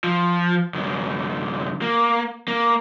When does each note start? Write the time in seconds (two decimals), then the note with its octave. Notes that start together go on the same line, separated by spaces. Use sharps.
0.04 F3
0.74 F#2 D3
1.82 A#3
2.48 A#3